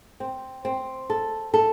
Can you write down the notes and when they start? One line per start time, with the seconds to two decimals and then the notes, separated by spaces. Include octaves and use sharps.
0.20 C4
0.65 C4
1.10 A4
1.54 A4